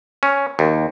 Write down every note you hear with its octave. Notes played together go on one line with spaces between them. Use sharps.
C#4
D#2